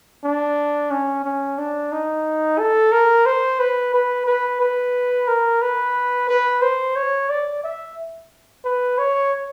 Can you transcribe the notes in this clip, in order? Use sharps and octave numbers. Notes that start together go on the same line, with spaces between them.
D4
C#4
C#4
D4
D#4
A4
A#4
C5
B4
B4
B4
B4
A#4
B4
B4
C5
C#5
D5
E5
B4
C#5